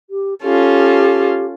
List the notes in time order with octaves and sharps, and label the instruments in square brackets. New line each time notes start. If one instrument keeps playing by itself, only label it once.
[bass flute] G4
[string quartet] C#4 F4 A4 [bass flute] G4